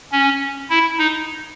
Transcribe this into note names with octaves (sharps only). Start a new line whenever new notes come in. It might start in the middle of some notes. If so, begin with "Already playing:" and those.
C#4
E4
D#4